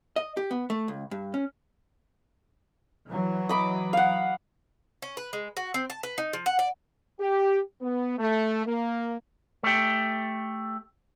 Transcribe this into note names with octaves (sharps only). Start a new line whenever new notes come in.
D#5
G4
B3
A3
C#2
G2
C#4
E3 F#3
D#5 B5 D6
F5 F#5
C#4
B4
G#3
F#4
C4
A5
B4
D#4
F3
F#5
D5
G4
B3
A3
A#3
A3 G4